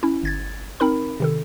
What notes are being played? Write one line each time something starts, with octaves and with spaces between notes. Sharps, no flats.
C#4 E4
G1 G#6 A6
C4 D#4 A#4 B5
C3 D#3 A4